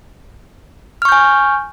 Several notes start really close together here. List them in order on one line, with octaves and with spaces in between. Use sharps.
F6 C#6 G6 G#5